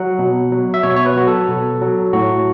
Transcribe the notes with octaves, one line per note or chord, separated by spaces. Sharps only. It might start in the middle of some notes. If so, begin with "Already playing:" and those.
Already playing: F#3 F#5
B2
F#3
E5
B2 C#5
C#5
B4
F#3 F#4
A4
B2
F#3
A2 F#4